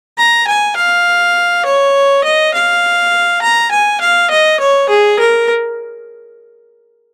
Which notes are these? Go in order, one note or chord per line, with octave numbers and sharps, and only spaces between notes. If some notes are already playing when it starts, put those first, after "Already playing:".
A#5
G#5
F5
C#5
D#5
F5
A#5
G#5
F5
D#5
C#5
G#4
A#4